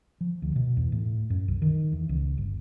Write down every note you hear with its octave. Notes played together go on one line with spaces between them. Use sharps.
F3
D2
B2
E2
A2
F#2
B1
D#3
E2
C#2
G1